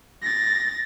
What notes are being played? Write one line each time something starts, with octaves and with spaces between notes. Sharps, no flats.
A6 A#6